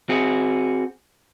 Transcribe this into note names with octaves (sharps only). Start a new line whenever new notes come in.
C4 F#4 G#4